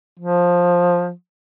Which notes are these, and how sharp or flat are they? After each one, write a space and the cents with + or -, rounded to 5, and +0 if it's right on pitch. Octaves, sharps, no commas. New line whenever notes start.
F3 +15